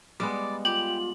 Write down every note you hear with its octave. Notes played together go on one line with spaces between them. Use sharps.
G3 G#3 B3 D5
F4 G4 F#7